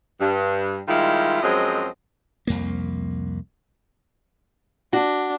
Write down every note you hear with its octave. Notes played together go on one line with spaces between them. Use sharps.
G2
D#3 G3 G#3 E4 F4
F#2 F3 F#3 G#3 C4 D#5
C2 F2 A#3
D4 F#4